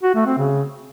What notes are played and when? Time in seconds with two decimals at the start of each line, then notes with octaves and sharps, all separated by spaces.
0.03 F#4
0.15 A3
0.26 C4
0.38 C#3